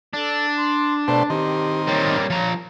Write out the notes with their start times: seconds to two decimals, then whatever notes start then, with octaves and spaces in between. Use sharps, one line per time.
0.14 D4 A4
0.56 C6
1.08 B2 A3 C5 D5 A5 A#5
1.30 D#3 C4 G4
1.87 G3 A#3 C#5
2.30 F3 A#5